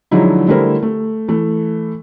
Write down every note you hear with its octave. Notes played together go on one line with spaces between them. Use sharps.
D3 F3 F#3 G#3 D#4 E4
D3 G3 A3 E4 A#4 C5
A3
E3 A3